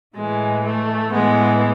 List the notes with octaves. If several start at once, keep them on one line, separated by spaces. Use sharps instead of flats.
A2 E3 G#3
A3
A2 E3 G#3 B3